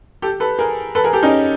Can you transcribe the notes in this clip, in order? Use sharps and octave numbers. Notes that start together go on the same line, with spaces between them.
G4 A4
A4 B4
G#4 A#4
A4 B4
G#4 A#4
G4 A4
C#4 D#4